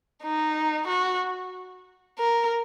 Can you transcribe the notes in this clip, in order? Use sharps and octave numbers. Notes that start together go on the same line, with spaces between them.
D#4
F#4
A#4